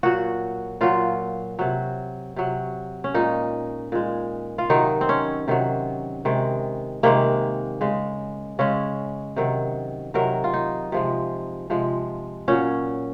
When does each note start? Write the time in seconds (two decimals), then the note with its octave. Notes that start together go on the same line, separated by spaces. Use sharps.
0.03 A#2 F#3 F#4
0.81 A#2 F#3 F4
1.59 C3 F#3
2.36 C3 F#3
3.04 C#4
3.14 A#2 G#3 D#4
3.92 A#2 G#3
4.58 F4
4.70 C3 D#3 F#3 D#4
5.01 C4
5.09 C#4
5.48 C3 D#3 F#3
6.25 C3 D#3 G#3
7.03 C3 D#3 G#3 A#3
7.81 C#3 G#3
8.59 C#3 G#3 C#4
9.36 C3 D#3 F#3
10.14 C3 D#3 F#3 A#4
10.44 F4
10.53 D#4
10.92 C3 F3 G#3
11.70 C3 F3 G#3
12.48 A#2 F#3 C#4